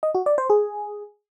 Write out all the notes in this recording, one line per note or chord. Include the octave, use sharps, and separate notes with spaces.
D#5
F#4
D5
C5
G#4